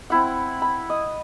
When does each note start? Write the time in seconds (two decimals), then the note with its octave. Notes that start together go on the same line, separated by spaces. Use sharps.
0.10 C4 E4 F#5
0.62 B5
0.90 D#5